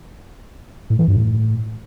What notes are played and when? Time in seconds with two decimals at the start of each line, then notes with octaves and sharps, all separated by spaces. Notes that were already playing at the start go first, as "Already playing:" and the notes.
0.90 A2
0.99 E3
1.08 G2
1.17 A2